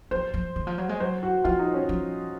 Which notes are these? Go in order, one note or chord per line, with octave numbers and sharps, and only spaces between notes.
F3 C5
F3
D#3
F3
F#3
G#3
F#3 C5
F#4
F3 F4
D#4
C#4
F3